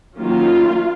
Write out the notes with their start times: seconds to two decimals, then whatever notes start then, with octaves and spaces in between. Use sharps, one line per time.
0.15 D#3 F#3 A#3 C#4 F4